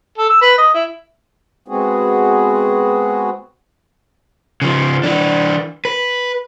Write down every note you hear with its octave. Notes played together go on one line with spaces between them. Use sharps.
A4
E6
B4
D#5
E4
G#3 B3 C4 F#4 G#4
C#3 F3
E3 D4
B4